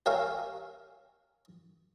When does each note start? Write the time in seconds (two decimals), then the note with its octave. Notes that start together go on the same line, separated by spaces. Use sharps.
0.06 G4 A#4 C#5 E5 F5 G#5